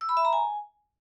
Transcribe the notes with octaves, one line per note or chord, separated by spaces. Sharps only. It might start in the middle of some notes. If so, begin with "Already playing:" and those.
E6
B5
E5
A#5
G#5